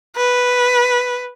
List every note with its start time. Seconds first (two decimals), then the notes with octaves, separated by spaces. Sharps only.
0.17 B4